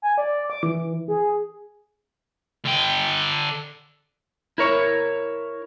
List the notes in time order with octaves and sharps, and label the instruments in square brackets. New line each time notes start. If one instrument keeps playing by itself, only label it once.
[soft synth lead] G#5
D5
D6
E3
G#4
[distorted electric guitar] D3 G5
[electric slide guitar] E4 A#4 C#5